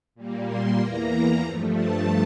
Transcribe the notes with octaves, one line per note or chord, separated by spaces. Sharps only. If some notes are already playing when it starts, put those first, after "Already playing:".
A#2 G3 A#3
C6
E2 E3 A#3 A#5
G2 F3 A3
A5